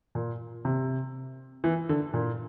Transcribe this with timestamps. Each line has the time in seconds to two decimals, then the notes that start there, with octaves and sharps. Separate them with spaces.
0.15 A#2
0.65 C3
1.64 E3
1.89 D3
2.14 A#2